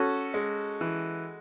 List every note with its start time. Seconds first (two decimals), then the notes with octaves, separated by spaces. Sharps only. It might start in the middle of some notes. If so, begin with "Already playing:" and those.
Already playing: C#4 F#4 A4
0.34 G#3
0.81 E3